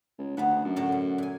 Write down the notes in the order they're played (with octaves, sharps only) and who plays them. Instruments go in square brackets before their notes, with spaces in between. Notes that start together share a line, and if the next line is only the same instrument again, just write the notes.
[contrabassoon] C#2
[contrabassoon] D2 [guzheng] B3 E5 F#5
[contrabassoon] F#2
[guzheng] A2 D3 F#3
B2
A#2 G#5